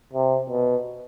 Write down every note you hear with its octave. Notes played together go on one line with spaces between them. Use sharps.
C3
B2